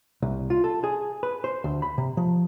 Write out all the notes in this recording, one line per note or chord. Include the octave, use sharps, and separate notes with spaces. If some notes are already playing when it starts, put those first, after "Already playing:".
C2
F4
A4
G#4
B4
C5
D2
B5
C3
F3